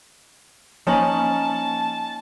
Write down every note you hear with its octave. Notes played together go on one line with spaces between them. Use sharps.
F3 A#3 C#4 D#4 A5 F#7